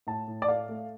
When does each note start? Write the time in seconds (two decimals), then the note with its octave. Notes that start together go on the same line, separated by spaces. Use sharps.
0.07 A2 A5
0.27 A2
0.42 D5
0.48 A3 F5
0.69 A3